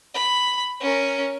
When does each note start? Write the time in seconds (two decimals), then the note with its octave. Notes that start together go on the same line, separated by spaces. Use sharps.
0.14 B5
0.80 C#4 A#4